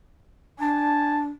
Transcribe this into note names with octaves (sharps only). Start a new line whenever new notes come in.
D4 G#5 A5